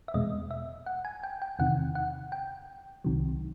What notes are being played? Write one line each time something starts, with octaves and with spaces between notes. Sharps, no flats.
E5
E2 B2 G#3 D#5
E5
F#5
G#5
G5
G5
E2 C3 D#3 F#5
F#5
G5
C2 C3 D#3 F#3